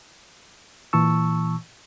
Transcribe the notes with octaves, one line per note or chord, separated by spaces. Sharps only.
A#2 E3 A5 C#6 E6